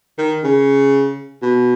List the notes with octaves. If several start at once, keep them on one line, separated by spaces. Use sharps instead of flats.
D#3
C#3
B2